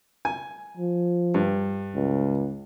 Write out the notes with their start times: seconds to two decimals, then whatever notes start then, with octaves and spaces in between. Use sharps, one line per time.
0.25 G#5
0.77 F3
1.34 G2
1.95 C#2